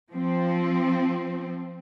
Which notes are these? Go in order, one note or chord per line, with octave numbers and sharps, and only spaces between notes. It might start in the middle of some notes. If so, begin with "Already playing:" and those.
F3 C4